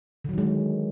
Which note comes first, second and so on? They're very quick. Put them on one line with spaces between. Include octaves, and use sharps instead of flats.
D3 F#3 D#3 G#3